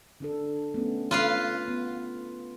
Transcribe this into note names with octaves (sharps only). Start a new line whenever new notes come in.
D3 D4 A4
A3 B3 C#4
F4 B4 F5
B3